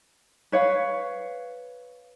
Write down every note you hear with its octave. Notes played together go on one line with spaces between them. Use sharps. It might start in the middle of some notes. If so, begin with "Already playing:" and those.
B4 C#5 F5